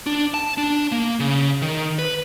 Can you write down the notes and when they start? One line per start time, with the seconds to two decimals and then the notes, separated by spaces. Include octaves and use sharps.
0.06 D4
0.34 A5
0.58 D4
0.92 A#3
1.20 C#3
1.62 D#3
1.99 B4